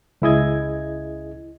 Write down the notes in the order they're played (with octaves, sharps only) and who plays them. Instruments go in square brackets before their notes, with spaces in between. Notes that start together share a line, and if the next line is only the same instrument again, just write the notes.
[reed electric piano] C#2 C#3 E4 G#4 D#5 G#6